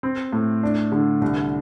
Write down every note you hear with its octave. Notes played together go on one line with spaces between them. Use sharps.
C4
A2
D4
D3
C2